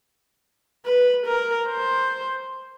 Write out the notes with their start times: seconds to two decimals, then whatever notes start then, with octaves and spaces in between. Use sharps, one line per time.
0.86 B4
1.26 A#4
1.68 C5